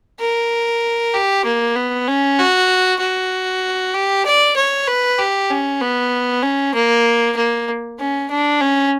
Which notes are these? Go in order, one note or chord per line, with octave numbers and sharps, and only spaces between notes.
A#4
G4
A#3
B3
C#4
F#4
F#4
G4
D5
C#5
B4
G4
C#4
B3
C#4
A#3
A#3
C#4
D4
C#4